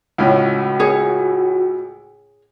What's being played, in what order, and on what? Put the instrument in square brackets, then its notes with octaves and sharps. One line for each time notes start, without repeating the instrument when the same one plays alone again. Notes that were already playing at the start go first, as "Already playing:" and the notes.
[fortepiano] C#2 A2 C#4 [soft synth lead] F#4
[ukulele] G#4 C#5